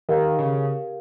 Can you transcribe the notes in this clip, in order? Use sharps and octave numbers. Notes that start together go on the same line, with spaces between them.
D#3 G4 A#4 F5
C#3